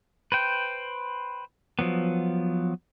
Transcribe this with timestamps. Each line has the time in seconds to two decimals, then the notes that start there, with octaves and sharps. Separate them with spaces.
0.32 B4 C5 G5
1.79 F3 F#3 B3